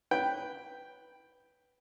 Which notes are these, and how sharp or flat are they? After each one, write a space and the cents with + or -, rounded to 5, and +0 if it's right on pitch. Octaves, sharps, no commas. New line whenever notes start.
B4 +0 G5 +0